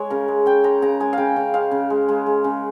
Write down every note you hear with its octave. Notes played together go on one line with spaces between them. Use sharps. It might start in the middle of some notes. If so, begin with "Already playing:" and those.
Already playing: G#3 C#5
C#3 A#4
G#3
C#3 G5
G#3 A#5
C#3 A#5
G#3 G#5
C#3 F5 G5
C#3
G#3 F5
C#3
G#3
G#3
G#3
C#3